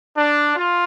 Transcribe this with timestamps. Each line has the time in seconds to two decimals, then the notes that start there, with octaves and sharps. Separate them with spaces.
0.17 D4
0.56 F4